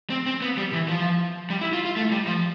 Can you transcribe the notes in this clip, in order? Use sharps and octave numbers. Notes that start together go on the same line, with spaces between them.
C4
C4
B3
G3
E3
F3
G3
E4
F4
F4
A3
G3
F3